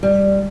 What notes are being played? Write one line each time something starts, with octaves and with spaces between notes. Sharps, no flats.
G3